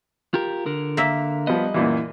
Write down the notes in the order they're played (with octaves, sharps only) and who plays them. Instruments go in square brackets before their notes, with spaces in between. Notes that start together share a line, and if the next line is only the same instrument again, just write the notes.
[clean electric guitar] F4 G4 A#4
D3 A#4
[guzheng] A#3 E5
[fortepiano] F3 B3 [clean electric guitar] G3 D#5
[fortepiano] F#2 A#2 E3